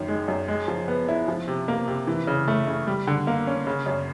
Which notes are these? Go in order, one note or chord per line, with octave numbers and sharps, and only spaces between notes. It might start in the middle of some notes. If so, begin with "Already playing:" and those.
Already playing: F#2 D#3
G#3
F#2
G#3
F3
B3
E4
F3
C3
A#3
C3
E3
C#3
A3
C#3
G3
D3
A#3
C#4
C#3
F#2